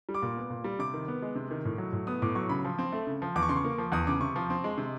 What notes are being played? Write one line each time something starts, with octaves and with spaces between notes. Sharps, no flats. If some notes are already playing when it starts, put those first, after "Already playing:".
G3
D6
A#2
B3
A#2
G3
C3 D6
D#3
B3
G#3
C3
D#3
A2
F#3
A2
B3 D#6
A2 D6
F#3 C#6
C#3 B5
F3
C4
A3
C#3
F3
E2 D6
C#6
C#3 C6
C#6
A#3
F3
E2 D#6
C#3 D6
C3 C#6
F3
C4
G#3
C3